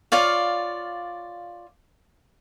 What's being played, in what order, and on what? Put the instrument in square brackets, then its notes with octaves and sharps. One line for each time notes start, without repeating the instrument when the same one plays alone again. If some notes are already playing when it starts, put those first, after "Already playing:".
[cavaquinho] F4 C#5 D5 F5